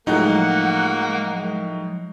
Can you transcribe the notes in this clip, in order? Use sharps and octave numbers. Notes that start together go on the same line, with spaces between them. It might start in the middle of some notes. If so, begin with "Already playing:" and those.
A2 F3 F#3 G#3 A#3 D#4 F#5